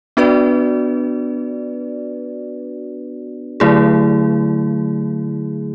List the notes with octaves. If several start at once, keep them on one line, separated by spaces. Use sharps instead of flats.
B3 D4 F#4 B4 D5
D3 F#3 A3 E4 G#4